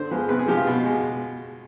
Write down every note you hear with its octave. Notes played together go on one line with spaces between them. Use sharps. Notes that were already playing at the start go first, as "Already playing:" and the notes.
Already playing: D3 C5
F3 G#3 B4
C3 B4
G#4
F3 G#3 G4
F4
B2
G#3